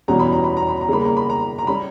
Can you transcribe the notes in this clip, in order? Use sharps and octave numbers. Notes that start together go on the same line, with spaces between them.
E2 B2 G3 C#4 A#5
B5
A#5
B5
A#5
B5
A#5
C#3 G3 A#3 B5
A#5
B5
A#5
A#5
G3 C#4 B5